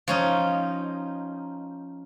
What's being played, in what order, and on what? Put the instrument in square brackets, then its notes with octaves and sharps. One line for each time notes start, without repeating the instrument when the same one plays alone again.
[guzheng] F3 C#4 D#4